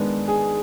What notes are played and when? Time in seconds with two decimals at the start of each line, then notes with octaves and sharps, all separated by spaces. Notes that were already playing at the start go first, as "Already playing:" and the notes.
Already playing: G#2 D#3 G#3 B3 D4
0.28 G#4